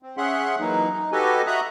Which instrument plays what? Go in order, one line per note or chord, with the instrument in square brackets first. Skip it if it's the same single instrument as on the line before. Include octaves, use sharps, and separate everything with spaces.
[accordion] C4
C#4 G#4 E5 F#5 C6 F#6
E3 F#3 A#3 D#4
D#4
F#4 G4 A4 B4 D#5 G#5
F#4 D#5 E5 A#5 D#6 F#6